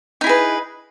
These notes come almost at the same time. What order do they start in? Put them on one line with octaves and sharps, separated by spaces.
D#4 E4 G#4 B4